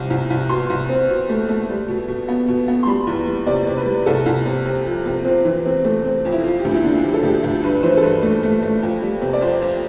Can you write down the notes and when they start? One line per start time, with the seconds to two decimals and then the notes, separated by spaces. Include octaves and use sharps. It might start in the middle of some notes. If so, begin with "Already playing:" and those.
Already playing: C2 C3 F3
0.10 C2
0.30 C2
0.49 B2 C6
0.70 C2
0.89 C4
1.09 B2
1.29 A3
1.49 A3
1.69 G3
1.88 B2
2.08 B2
2.28 B3
2.48 B2
2.68 B3
2.83 C6
2.87 G3 B5
3.07 E2
3.27 G3
3.46 C3 D5
3.67 C3
3.77 B4
3.86 G3
4.06 C2 A4
4.26 C2
4.46 C3
4.66 C3
4.86 F3
5.06 C3
5.25 C4 F4
5.45 E3
5.66 C4
5.85 A3
6.05 C4
6.25 F2
6.32 E4
6.44 F3 F4
6.59 G4
6.65 D2
6.74 E4
6.84 D3 F4
7.03 F3 G4
7.14 A4
7.23 D2 G4
7.44 D2
7.63 G2 B4
7.83 E3 C5
7.97 A4
8.02 G2 B4
8.23 A3
8.43 A3
8.63 A3
8.82 F2
9.02 G3
9.22 C3
9.33 D5
9.41 F2 C5
9.62 F2